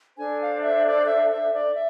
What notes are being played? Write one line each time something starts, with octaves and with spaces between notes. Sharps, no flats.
D4 A4 C5 G#5
F5
E5
D5
E5
E5
D5
E5